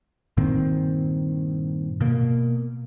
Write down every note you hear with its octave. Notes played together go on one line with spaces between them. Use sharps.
G2 A#2 D#3 C4
B2 A#3